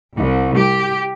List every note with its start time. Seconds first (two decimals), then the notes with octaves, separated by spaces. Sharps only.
0.17 C2
0.58 G4